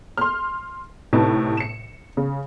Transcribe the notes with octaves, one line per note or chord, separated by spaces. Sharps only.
C6 F6
A2 C3 D#4 B4 A5
C#7 E7
C#3